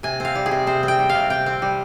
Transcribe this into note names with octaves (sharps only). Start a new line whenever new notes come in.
C3 G#5
C4 F5
G3
G#4
C3
C3 C5
C4
G5
G3
F5
C3
C3 G5
C4
G3